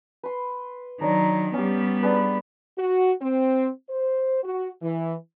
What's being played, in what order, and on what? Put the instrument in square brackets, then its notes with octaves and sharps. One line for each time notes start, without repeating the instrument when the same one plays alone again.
[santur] B4 C6
[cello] D#3 F#3 [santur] D4 C#5 A#5
[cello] G3 B3 [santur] C#4 G4
[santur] D4 G#4 B4
[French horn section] F#4
C4
C5
F#4
E3